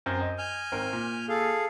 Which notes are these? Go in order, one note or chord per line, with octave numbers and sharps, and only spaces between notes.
F#2 C4 G6
D#5
G#5 F6 G6
G#1 C4 A#4
A#2
G#4 A4 F5